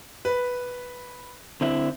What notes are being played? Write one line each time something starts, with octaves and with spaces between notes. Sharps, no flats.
B4
D3 C4 E4